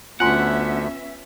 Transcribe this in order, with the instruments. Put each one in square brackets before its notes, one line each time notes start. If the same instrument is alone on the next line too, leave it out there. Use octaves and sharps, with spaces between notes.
[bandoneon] D2 [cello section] B3 C#4 E5 [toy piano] F4 G#5 C6 [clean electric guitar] F#5